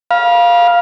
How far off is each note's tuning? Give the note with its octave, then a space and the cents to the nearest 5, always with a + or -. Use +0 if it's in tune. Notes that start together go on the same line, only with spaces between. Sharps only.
F5 +0 B5 -40